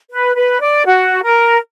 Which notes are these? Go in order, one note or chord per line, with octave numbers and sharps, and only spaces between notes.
B4
B4
D5
F#4
A#4